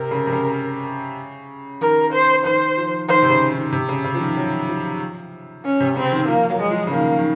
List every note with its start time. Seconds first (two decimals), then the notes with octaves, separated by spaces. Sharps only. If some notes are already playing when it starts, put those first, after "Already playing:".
Already playing: C3 A#4
0.11 C#3
0.27 C3
0.32 C#3
1.81 D#3 A#4
2.13 C5
2.45 D#3 C5
2.77 F3
3.09 D#3 C5
3.22 C3
3.30 C#3
3.52 D#3
3.72 C3
3.89 C#3
4.04 C#3
4.15 F3
4.20 D#3
4.37 F#3
4.69 F3
5.65 C#4
5.80 C3
5.96 C#3 C4
6.12 D#3
6.28 F3 A#3
6.50 F#3
6.60 G#3
6.71 F3
6.87 C#3
6.92 D#3 A#3
7.19 D#3